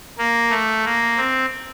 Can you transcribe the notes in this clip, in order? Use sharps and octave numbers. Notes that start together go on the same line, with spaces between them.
A#3
A3
A#3
C4